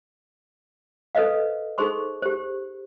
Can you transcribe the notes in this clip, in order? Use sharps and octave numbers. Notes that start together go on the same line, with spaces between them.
A4 B4 C5 D#5 F5
D#4 G#4 A4 C5 C6 C#6
G4 C5